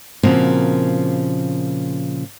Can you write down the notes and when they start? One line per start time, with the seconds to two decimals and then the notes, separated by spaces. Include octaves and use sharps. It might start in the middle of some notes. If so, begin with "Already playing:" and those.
0.23 A#2 C#3 F3 A#3 C4 F#4